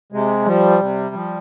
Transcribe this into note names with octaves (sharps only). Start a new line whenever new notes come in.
C3 G#3
F3 G3
C3
F3